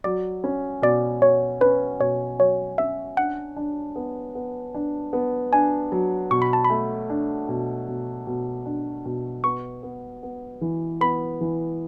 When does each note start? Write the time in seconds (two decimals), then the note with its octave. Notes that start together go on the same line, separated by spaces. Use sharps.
0.04 F#3 D5
0.44 C#4
0.82 B2 D5
1.21 B2 C#5
1.61 C#4 B4
2.00 B2 C#5
2.39 F#3 C#5
2.78 C#4 E5
3.17 D4 F#5
3.56 D4
3.96 B3
4.35 B3
4.74 D4
5.13 B3
5.53 D4 G#5
5.92 F#3
6.31 B2 C#6
6.42 B5
6.53 A5
6.64 B5
6.70 A3
7.10 D4
7.49 B2
7.88 B2
8.27 B2
8.65 D4
9.05 B2
9.44 B3 C#6
9.83 B3
10.23 B3
10.61 E3
11.01 B3 B5
11.41 E3